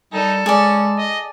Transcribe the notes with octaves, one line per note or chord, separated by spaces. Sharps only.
G3 D#4 A4
G#3 C#4 G#4 D5
D#5